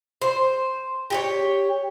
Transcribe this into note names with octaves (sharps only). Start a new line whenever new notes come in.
C5
G4 G#4 C#5